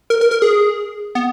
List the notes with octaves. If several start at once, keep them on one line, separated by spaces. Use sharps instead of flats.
A#4
A#4
A#4
G#4
B3